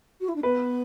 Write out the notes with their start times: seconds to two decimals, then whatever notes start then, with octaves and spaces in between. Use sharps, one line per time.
0.20 F#4
0.28 E4
0.35 D4
0.43 B3 B4